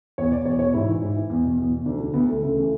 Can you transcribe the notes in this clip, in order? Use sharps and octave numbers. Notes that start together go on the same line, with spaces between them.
E2 C#5
B2 D5
E2 C#5
B2 C#5
G#2 E4
E3
G#2
E3
E2
B2
E2
B2
D2 D4
D3
D2 B3
D3 A3
C#2 A3
C#3 E3